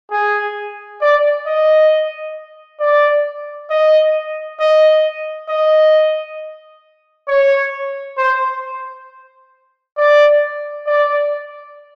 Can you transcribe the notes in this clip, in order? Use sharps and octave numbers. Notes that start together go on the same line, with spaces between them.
G#4
D5
D#5
D5
D#5
D#5
D#5
C#5
C5
D5
D5